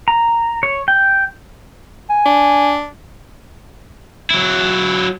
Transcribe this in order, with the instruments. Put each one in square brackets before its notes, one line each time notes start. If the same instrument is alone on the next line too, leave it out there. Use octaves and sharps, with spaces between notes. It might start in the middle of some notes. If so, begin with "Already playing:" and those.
[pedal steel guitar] A#5
C#5
G5
[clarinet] G#5
[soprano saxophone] D4
[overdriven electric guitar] F#3 E4